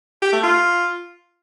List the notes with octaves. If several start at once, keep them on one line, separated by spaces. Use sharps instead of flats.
G4
A3
F4